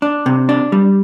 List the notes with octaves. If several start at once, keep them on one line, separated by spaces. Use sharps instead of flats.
D4
C3
D4
G3